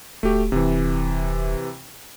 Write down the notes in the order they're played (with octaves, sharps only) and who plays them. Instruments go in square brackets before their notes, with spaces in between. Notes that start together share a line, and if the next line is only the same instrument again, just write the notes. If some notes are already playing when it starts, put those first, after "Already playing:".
[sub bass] D1 [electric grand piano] A3 F#4 G4
[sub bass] D#1 [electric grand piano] C3 E3